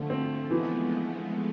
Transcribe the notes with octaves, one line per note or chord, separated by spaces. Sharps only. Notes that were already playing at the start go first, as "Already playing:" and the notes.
Already playing: D3 F3 A3
C4
E3 G#3 B3